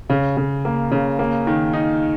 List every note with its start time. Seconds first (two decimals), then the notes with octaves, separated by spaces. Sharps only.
0.10 C#3
0.37 C#3
0.65 A#3
0.91 C#3
1.19 A#3
1.47 D#3
1.73 D#4